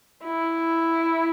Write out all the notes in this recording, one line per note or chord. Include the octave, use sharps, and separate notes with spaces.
E4